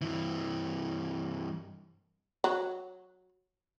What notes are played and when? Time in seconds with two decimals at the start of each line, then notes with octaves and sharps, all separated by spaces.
0.01 G2 E3
2.44 F#3